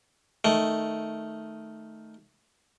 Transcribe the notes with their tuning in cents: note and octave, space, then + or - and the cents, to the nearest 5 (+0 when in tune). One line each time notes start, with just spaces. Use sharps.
D#3 +0 A3 +0